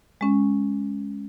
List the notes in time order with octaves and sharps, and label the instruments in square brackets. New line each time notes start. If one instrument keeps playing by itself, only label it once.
[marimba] G#3 C#4